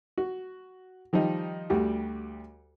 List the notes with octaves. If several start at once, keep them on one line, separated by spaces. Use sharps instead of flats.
F#4
D#3 F3 G3 D#4
D2 G3 F#4 G4